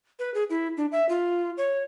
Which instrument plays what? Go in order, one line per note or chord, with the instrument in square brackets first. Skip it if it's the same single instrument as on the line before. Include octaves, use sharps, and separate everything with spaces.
[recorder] B4
G#4
E4
D4
E5
F4
C#5